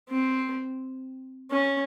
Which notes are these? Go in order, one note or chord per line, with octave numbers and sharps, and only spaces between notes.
C4
C#4